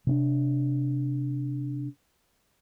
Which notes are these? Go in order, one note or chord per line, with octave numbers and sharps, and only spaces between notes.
C3 C4 D4